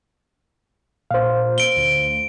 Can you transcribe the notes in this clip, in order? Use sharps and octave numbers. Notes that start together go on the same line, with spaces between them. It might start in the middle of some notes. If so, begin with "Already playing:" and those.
A#2 C5 F5
D7 G7
D2